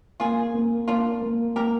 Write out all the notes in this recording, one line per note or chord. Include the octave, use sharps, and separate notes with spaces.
A#3 F4 G#4
A#3
A#3 D4 F4
A#3
A#3 G4 A#4